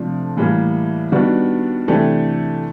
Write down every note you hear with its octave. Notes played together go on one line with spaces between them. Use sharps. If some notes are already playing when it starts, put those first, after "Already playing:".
Already playing: C3 F3 A3 D4
A2 E3 G3 A#3
D#3 G3 B3 D4 F#4
C3 E3 A3 D4 G4